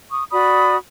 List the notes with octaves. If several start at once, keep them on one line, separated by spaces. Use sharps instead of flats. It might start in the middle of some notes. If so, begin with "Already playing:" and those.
C#6 D#6
F#4 D5 B5 D#6